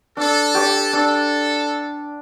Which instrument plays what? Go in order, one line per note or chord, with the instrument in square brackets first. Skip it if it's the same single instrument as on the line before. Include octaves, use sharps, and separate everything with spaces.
[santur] D4 [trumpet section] A4
[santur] G4 D5
[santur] D4 [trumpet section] A4